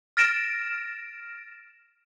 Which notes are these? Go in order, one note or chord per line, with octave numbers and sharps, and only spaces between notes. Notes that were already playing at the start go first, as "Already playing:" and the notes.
F6 A6 A#6 D7 E7